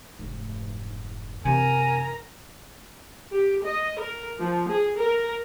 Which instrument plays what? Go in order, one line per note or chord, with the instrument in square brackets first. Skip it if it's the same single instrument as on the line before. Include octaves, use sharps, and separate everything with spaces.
[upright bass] F1 G#2
[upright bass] F#2 E3 [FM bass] C3 [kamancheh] A#4 A#5 [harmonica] G#5
[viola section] G4
D#5
A#4
F3
G#4
A#4